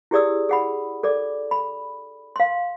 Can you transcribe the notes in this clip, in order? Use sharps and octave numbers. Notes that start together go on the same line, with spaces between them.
E4 G4 G#4 D5 D#6 E6
G#4 F#5 B5
A4 D5 D6
B5
F5 C6